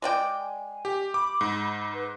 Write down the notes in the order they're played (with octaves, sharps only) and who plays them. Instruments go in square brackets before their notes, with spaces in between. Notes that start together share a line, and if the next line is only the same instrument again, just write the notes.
[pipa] G#3 D5 G5 [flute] D6
[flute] G#5
[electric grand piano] G4
[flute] B5 [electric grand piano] D6
[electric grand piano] G#2
[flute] B4